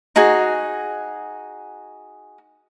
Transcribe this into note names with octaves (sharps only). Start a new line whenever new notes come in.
D#4 F#4 G#4 G#5